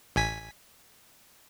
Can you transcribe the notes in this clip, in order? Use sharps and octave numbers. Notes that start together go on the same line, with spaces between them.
A1 G#5 B6